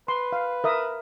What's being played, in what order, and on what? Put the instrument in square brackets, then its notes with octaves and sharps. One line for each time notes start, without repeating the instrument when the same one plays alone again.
[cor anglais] B4 [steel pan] C6
[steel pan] F5
A#4 E5 D#6